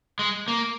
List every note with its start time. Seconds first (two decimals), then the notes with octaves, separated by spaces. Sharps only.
0.19 G#3
0.48 A#3